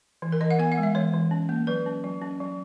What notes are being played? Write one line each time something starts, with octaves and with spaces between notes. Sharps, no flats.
E3
A#4
E3 D#5
F#5
B3 G#5
F#5
G#3
E5
E3 C#5
E3
C#4
A#3
F#3 B4
C#4
F#3
C#4
F#3